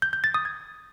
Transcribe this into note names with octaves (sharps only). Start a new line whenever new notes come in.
G6
G6
A6
D#6
G#6